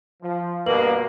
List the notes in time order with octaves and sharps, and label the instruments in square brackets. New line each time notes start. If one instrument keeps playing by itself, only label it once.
[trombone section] F3
[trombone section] G2 B2 A#3 [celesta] B4 F#7